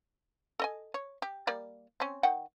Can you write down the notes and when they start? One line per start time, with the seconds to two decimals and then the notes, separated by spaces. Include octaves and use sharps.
0.60 A4 D#5 G#5
0.94 C#5
1.22 G4
1.47 G3 A#3 D5
2.00 C4 C#4
2.23 D#3 F#5 G5